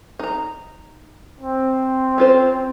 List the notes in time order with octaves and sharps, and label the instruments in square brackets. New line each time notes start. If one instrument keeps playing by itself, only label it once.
[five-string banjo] D#4 A#5
[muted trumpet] C4
[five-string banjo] C#4 F4 C5